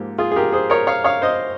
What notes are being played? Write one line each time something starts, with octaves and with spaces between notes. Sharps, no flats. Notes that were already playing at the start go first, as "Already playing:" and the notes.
Already playing: G#2 F3 A#3 G4
F4 G#4
G#4
G4 A#4
G#4 C5
A#4 C#5
C#5 F5
C#5 F5
C5 D#5